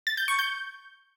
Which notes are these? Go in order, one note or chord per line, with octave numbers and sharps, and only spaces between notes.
A6
G6
C#6
G6